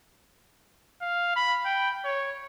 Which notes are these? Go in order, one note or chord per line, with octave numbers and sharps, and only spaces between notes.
F5
B5
G5
C#5